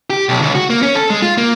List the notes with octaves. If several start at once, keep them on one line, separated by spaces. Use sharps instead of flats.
G4
B1
C#2
F#4
A#3
C#4
A4
G#3
F4
A#3